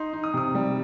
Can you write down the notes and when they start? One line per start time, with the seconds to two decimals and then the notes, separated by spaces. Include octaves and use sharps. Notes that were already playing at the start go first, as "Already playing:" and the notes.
Already playing: D#4 C6
0.13 D#4
0.24 D#6
0.34 C3 D#6
0.55 G3